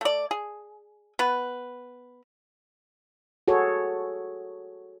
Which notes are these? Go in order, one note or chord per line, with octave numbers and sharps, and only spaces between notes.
A3 D5
G#4
B3 B4
F#4 G#4 A4 C#5